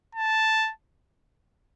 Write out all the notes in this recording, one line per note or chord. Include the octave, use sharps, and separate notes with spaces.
A5